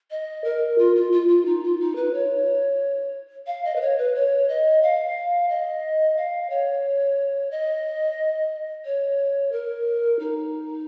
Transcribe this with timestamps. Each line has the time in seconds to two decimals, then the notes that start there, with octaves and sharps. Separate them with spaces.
0.11 D#5
0.44 A#4
0.78 F4
0.96 F4
1.12 F4
1.28 F4
1.45 D#4
1.63 F4
1.80 D#4
1.96 B4
2.13 C#5
3.47 F5
3.65 D#5
3.76 B4
3.81 C#5
3.98 B4
4.15 C#5
4.48 D#5
4.82 F5
5.49 D#5
6.17 F5
6.50 C#5
7.51 D#5
8.85 C#5
9.52 A#4
10.19 D#4